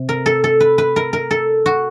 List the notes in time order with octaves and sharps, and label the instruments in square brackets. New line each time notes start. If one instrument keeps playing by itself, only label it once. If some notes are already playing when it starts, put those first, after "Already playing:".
Already playing: [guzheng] C3
A#4
A4
A4
B4
B4
A#4
A#4
A4
F#4